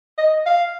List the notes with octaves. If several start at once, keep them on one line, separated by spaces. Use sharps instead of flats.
D#5
F5